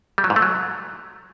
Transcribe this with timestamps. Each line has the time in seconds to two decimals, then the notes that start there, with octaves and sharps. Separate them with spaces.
0.18 G3
0.24 F#3
0.30 G#2
0.36 A3
0.42 F#3